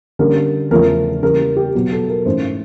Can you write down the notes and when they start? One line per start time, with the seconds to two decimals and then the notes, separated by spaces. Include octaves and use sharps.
0.19 D3 G3 A#3 C#4 A#4
0.71 E2 C#3 F3 A3 C#4 A#4
1.23 C#3 E3 G3 A#3 A#4
1.56 G4
1.75 B2 F#3 B3
1.92 A4
2.09 A#4
2.26 G#2 E3 A3 C#4 C5